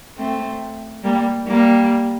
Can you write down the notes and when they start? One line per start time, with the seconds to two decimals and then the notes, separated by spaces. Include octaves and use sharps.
0.17 A3 C4
1.04 G3 A#3
1.47 G3 A#3